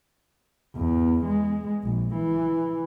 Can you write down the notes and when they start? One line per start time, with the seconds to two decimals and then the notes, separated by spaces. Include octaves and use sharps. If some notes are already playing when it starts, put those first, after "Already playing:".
0.76 E2
1.25 G#3
1.84 A#1
2.15 E3